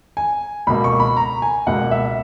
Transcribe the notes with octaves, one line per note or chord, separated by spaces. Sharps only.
G#5
C#2 B2 A#3 B5
C#6
B5
A#5
G#5
C#2 B2 A#3 F#5
E5